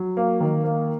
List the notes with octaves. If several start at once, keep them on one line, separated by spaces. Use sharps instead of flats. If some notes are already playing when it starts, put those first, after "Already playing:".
Already playing: F#3
A#3
D#3
A#3